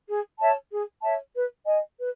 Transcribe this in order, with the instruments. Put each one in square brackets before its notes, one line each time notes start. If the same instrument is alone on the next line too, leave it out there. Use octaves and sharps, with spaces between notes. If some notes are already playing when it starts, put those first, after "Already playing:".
[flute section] G#4
C#5 E5 A5
G#4
C#5 E5 A5
B4
D#5 G#5
B4